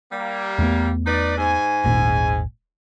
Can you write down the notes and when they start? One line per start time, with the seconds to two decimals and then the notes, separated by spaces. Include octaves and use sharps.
0.11 G3 A#3
0.58 E2 A3 B3
1.05 D#4 B4 D5
1.37 G#2 G#5
1.84 D#1 G#1 A#2